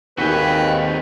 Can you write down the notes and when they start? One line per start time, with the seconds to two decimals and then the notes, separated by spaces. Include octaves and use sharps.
0.18 D#2 C4 F#4 G#4 B4 G5